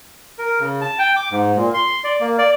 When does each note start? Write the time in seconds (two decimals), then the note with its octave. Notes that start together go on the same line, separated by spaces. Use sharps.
0.39 A#4
0.60 C#3
0.81 A5
0.99 G5
1.16 D6
1.31 G#2
1.56 A#2
1.74 C6
2.04 D5
2.20 A#3
2.38 D5